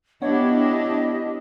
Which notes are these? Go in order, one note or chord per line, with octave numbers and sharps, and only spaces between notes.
B3 D4 E4 G4 C#5 D#5